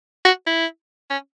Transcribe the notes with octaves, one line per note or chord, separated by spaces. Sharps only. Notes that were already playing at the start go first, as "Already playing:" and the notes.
F#4
E4
C#4